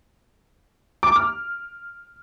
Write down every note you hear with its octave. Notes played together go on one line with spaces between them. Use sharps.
D6
F6